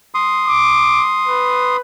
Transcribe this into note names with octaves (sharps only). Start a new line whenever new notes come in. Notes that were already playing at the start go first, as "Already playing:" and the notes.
C6 D#6
D6
B4